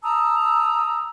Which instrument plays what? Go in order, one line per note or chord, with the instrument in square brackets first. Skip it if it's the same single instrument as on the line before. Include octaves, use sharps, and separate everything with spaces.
[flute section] A5 A#5 D#6 E6